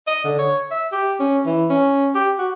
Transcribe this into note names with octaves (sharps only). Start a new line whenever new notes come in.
D#5
D3
C#5
E5
G4
C#4
E3
C#4
G4
F#4